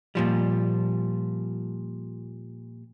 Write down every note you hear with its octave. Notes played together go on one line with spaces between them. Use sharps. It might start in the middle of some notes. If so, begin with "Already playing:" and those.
A#2 F3 G3